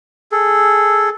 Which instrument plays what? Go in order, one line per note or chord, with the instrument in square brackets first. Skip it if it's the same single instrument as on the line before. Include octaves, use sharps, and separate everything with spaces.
[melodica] G#4 A4